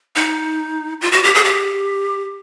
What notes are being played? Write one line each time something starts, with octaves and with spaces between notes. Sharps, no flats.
D#4
F4
F#4
G4
G#4
G4